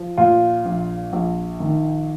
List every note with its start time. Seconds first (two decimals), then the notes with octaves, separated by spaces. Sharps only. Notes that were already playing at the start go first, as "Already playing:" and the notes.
Already playing: F3
0.18 A#2 F4
0.65 A#1
1.13 A#1
1.60 D#3